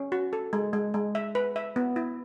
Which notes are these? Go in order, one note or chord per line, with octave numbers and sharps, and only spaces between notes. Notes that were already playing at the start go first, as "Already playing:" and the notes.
Already playing: C#4
F#4
A4
G#3
G#3
G#3
E5
B4
E5
B3
E4